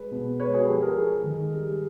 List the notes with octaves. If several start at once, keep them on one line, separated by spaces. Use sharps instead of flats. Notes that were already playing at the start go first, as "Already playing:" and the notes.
Already playing: G#3 B4
B2
G#3 B4 C#5
F#4 G#4
F3 G4 A4
G#4 A#4
G#3
D#3
G3